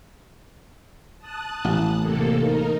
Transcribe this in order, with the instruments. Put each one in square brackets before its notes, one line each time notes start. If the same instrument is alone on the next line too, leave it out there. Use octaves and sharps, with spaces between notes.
[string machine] A5 D#6 F#6
[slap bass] A1
[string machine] C3 A#3 A4
D#4 A#4